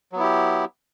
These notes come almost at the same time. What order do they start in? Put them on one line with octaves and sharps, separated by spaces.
F#3 B3 E4 G4